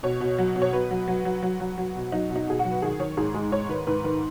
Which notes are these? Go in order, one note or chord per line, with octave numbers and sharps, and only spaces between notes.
B2 C#5
B2
F#3
B2
C#5
B2 B4
F#3
F#3
F#3
F#3
F#3
F#3
B2
F#3 D#4
B2
D#4
B2 G#4
F#4
F#3
B4
D#3 G#4
D#3 C#5
G#2 G#4
G#3
G#2 C#5
D#3 B4
G#2 B4
D#3 B4